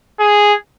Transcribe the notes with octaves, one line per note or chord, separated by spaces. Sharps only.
G#4